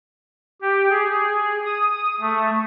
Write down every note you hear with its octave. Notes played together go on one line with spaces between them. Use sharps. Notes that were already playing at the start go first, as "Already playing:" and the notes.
G4
G#4
D#6
A3